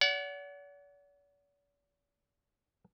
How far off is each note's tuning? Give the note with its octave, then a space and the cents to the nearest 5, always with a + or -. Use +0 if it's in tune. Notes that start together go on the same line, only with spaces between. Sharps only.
D5 -45 F#5 +5